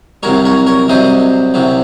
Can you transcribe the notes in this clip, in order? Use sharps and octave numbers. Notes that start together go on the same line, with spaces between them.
C2 C3 F#3 A#4 C#5
A#4 C#5
A#4 C#5
C2 C3 F#3 C5 D#5
C2 C3 F#3